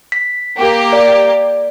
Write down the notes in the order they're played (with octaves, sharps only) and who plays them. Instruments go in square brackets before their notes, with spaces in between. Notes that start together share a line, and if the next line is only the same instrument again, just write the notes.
[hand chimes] B6
[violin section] A#3 G4
[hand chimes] D5